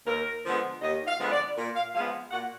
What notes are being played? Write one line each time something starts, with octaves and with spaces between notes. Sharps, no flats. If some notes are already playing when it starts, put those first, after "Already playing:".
D#2 A#4
D3 F3 G#3 B3
D#2 D#5
F5
D3 F3 G#3 B3 B4
D5
A#2 A#4
F5
F3 G#3 B3 F5
A#2 F#5